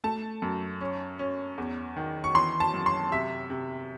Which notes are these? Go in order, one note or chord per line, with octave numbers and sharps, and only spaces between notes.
A3 A5
F#2
C#4
C#4
E2
D#3
C#6
E3 C6
A5
F#2
C6
C3 E5
C3